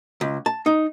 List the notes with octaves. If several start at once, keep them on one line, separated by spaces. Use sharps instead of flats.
C#2
A5
D#4